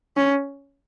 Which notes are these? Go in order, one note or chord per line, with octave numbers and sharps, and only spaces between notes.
C#4